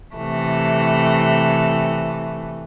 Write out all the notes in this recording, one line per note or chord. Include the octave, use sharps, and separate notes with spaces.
C3 E3 A3